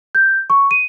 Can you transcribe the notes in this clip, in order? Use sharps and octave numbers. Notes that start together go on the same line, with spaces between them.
G6
C#6
D#7